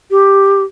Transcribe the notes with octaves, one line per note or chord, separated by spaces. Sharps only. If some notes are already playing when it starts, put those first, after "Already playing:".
G4